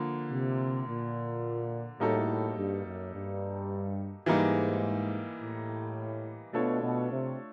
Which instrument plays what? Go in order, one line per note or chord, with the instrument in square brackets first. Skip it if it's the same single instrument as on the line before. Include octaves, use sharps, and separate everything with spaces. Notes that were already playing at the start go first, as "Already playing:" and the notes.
Already playing: [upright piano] D3 F3 A#3
[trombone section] C3
A#2
[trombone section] A2 [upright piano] G3 A#3 D#4 F#4 A4
[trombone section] G2
F#2
G2
[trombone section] G#2 [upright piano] E3 G3 A#3 D#4
[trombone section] A2
[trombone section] B2 [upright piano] A3 D4 F4 A4 C#5
[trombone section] B2
C3